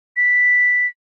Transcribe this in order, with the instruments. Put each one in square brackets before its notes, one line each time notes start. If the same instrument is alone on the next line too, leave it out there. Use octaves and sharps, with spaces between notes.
[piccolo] B6